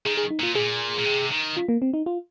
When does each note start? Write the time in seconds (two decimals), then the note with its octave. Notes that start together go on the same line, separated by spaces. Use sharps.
0.05 D#3 G#4
0.17 G#4
0.30 D#4
0.39 A#2 F4
0.55 A#2 G#4
0.98 A#2
1.05 C3
1.31 D#3
1.57 F4
1.69 A#3
1.82 C4
1.94 D#4
2.06 F4